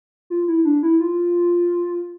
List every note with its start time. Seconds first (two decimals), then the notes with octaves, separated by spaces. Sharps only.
0.30 F4
0.48 E4
0.65 D4
0.83 E4
1.00 F4